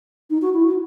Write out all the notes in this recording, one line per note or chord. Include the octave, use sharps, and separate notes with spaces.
D#4
F#4
E4
F#4